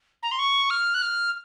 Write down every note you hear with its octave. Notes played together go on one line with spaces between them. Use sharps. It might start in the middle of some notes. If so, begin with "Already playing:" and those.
A#5
C6
C#6
F6
F#6
F6